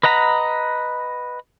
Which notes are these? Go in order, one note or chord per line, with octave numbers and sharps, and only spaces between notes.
B4 D#5 F#5 A#5 B5